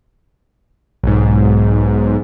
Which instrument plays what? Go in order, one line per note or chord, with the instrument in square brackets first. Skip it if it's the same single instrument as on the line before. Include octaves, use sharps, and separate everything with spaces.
[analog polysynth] B1 G#2